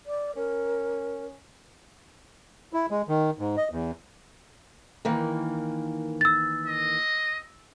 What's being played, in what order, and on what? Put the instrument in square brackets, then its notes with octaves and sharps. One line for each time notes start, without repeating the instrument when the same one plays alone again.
[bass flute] D5
[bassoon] C#4 [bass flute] A#4
[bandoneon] E4
G#3
D#3
G#2
D#5
E2
[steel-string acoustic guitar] D#3 E3 A#3
[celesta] E6 A6
[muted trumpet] D#5